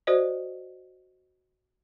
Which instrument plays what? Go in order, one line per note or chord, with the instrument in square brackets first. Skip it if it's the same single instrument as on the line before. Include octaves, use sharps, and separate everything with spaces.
[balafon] F#4 A#4 C5 D5 D#5